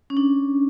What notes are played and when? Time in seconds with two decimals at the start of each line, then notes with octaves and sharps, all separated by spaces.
0.10 C#4
0.17 D4